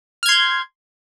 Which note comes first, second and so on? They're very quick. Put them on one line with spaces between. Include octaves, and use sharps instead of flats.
F6 G#6 C6 G6